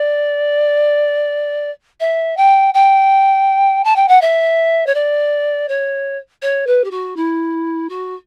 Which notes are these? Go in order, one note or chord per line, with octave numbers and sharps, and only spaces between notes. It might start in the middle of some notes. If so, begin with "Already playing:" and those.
Already playing: D5
E5
G5
G5
A5
G5
F#5
E5
C#5
D5
C#5
C#5
B4
G4
F#4
E4
F#4